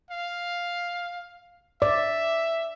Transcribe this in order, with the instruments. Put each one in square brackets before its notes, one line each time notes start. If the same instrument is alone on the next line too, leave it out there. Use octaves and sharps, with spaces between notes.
[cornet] F5
[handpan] D5 [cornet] E5